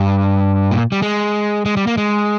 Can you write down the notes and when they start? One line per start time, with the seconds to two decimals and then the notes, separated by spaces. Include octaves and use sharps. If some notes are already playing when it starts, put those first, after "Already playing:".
Already playing: G2
0.71 A#2
0.92 G3
1.02 G#3
1.66 G#3
1.77 G3
1.87 A#3
1.97 G#3